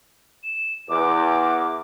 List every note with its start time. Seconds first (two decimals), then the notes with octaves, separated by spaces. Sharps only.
0.43 E7
0.89 E2 D6